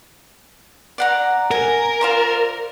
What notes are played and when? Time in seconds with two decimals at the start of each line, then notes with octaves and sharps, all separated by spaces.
0.98 D5 F#5 A#5
1.51 A#4 G#5
2.01 F4 C5 D5